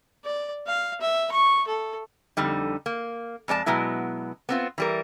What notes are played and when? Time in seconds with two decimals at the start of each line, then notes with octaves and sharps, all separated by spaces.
0.25 D5
0.67 F5
1.01 E5
1.32 C#6
1.67 A4
2.37 F2 D3 G3 D#4
2.86 A#3
3.48 F2 G#3 D5 A5
3.66 B2 F#3 G#3 B3 E4
4.49 B3 C4 F4
4.78 E3 G3 A#4